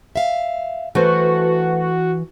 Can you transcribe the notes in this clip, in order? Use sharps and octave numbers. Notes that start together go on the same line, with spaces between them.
E5 F5
E3 A3 F#4 B4 C5